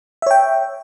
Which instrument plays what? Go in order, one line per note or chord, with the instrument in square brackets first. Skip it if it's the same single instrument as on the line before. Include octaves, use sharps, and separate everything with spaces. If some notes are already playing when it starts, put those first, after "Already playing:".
[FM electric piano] E5
C#5
G5